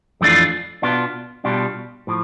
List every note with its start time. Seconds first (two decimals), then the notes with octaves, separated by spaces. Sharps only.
0.21 F2 E3 A3 D4 F4
0.82 B2 B3 D4 F4
1.44 B2 G3 D4 F4
2.07 A2 F3